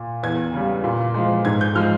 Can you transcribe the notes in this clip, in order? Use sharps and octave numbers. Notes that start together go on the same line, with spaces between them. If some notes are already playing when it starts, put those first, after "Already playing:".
Already playing: A#2
E2 G#6
C#3 G3
A#2
F3 G#3
G#2 G#6
G6
F3 G#3 F6